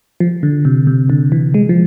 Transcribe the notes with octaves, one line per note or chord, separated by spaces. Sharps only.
F3
D3
C3
C3
D3
E3
G#3
F3